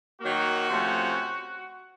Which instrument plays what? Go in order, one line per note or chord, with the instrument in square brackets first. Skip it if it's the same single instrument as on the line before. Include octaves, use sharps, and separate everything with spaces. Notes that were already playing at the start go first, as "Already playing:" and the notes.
[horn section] D#3 F#3 A#3 F#4
C3 F3 A3 C#4